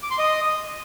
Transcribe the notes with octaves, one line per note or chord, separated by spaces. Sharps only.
D6
C6
D#5